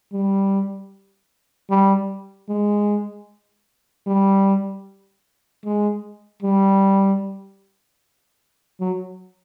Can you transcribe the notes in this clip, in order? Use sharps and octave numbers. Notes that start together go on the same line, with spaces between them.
G3
G3
G#3
G3
G#3
G3
F#3